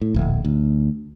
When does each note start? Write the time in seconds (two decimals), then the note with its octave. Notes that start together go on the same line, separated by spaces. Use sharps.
0.01 A2
0.14 D1 A#1
0.45 D2